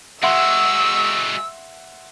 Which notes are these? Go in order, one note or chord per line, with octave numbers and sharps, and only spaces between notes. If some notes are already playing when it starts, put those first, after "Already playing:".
G#3 F#4 E5 F#5 C6 E6